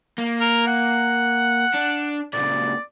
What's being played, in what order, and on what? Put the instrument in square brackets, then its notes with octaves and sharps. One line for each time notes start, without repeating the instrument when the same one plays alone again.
[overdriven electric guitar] A#3
[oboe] A#4
F#5
[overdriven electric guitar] D4
[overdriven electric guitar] A#2 C#3 [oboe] D5